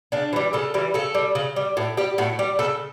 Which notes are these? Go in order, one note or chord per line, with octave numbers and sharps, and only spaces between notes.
C#3 D4
E3 G3
C#3 A4
E3 G3
C#3 A4
G3
C#3
G3
A2
G3 G4
A2 F#4
G3 G4
C#3 A4